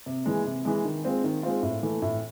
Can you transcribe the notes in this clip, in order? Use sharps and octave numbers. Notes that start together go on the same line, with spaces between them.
C3
E3 G#3
C3
E3 G#3
D#3
G#3 C4 F4
D#3
G#3 C4 F4
A2
E3 A3
A2